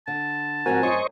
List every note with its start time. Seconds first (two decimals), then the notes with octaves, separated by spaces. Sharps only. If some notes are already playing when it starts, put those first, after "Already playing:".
0.07 D3 A5
0.66 G#2 F3 C4 F#4 A#4 G#5
0.83 F#2 F#4 G#4 C5 D#5 C#6